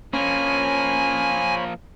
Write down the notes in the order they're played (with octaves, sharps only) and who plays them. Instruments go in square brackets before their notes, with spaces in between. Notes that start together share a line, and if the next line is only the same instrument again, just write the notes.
[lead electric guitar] F3 A#3 [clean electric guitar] C#4 [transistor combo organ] C5 C#5 B5 [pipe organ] G#5